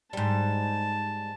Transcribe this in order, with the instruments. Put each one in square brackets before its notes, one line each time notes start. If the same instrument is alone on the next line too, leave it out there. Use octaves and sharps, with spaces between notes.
[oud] G#2 G3 [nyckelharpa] A5